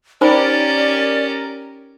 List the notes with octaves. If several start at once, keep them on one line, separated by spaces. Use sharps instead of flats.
C#4 D#4 G4 A#4 C5 D5 B5